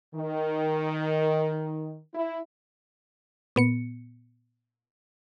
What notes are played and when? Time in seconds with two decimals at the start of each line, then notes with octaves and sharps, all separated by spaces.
0.14 D#3
2.14 E4
3.56 A#2 B3 C#7